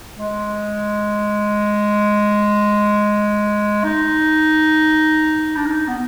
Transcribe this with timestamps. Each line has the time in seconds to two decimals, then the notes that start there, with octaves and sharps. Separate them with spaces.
0.18 G#3
3.84 D#4
5.56 D4
5.66 D#4
5.88 B3